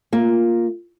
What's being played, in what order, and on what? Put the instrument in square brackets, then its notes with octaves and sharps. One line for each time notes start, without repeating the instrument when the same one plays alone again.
[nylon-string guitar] A#3 F4